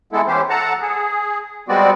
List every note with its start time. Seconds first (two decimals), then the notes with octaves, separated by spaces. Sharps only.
0.13 E3 G#3 B3 E4 A4
0.27 E3 C#4 G4 C5
0.50 A4 F#5 A5 A#5
0.81 G#4
1.69 G3 G#3 B3 C4 F#4 D5